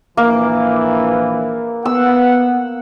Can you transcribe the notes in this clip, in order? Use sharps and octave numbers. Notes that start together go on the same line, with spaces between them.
A#1 E3 A#3
B3 F#5 E6